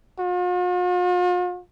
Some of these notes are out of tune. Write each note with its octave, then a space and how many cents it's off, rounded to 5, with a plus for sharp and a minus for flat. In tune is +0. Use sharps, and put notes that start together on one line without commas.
F4 +45